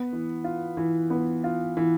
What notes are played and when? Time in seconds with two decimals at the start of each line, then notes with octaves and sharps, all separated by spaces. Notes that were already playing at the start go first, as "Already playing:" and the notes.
Already playing: B3
0.13 E3
0.44 F4
0.77 E3
1.10 B3
1.44 F4
1.77 E3